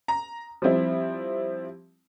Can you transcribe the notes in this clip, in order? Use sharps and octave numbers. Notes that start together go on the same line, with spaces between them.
A#5
F3 G3 C4 E4